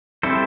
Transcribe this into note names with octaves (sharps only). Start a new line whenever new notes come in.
G3 C4 E4 A4 C5